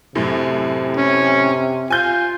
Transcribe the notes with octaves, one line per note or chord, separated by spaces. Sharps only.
F#2 A2 C3
C#4
F4 G#5 G6